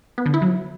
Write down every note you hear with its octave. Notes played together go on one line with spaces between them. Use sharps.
B3
D3
E4
F#3